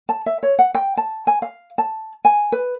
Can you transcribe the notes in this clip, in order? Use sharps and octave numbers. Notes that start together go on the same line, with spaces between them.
A5
E5
C#5
F#5
G5
A5
G#5
F5
A5
G#5
B4